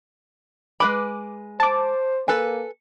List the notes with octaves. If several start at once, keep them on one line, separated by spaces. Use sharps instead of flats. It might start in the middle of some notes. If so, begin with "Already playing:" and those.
G#3 B4 B5 D6
C5 A5 D6
A#3 A4 B4 G#5